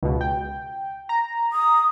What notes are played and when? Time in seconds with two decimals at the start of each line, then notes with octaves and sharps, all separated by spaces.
0.03 C#2 B2
0.21 G5
1.09 A#5
1.53 D#6